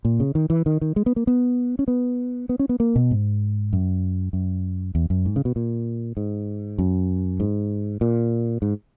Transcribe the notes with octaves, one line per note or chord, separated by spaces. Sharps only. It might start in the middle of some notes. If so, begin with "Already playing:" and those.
A#2
C#3
D#3
E3
D#3
D#3
G#3
B3
A#3
B3
C#4
B3
B3
C#4
B3
A#3
B2
G#2
F#2
F#2
E2
F#2
G#2
C#3
B2
A#2
G#2
F#2
G#2
A#2
G#2